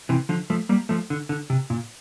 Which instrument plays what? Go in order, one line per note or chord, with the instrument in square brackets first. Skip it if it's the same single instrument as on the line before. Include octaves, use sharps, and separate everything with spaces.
[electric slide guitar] C3 E3
D3 F3
F3 A3
G3 A#3
F3 A3
D3
D3
C3
A#2